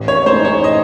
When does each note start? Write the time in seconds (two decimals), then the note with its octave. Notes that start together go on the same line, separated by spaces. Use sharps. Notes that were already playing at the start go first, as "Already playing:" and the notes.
Already playing: A1
0.08 C#5
0.26 A2 G#3 D#4 C5
0.45 C#5
0.64 D#5